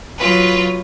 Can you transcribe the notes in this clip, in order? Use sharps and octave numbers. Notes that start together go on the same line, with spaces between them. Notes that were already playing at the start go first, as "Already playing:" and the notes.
F#3 F4 B4